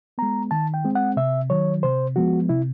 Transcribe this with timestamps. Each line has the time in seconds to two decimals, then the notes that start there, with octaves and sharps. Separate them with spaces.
0.18 G#3 B3 A#5
0.51 D#3 A5
0.74 G5
0.84 G#3 C4
0.95 F#5
1.17 C3 E5
1.50 D#3 F#3 C#5
1.83 C3 C5
2.16 F3 G#3 B3 F#4
2.49 C3 E4